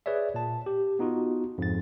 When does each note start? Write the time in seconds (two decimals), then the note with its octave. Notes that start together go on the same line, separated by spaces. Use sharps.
0.06 G#4 B4 C#5 D5 E5
0.34 A#2 A5
0.66 G4
0.99 B3 D#4 F4 F#4
1.58 F2 G#2 A6